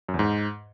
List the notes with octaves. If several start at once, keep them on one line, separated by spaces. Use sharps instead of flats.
F#2
E2
G#2